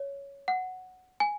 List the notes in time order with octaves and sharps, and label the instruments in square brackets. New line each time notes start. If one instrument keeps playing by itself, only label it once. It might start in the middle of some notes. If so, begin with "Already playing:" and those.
Already playing: [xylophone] C#5
F#5
G#5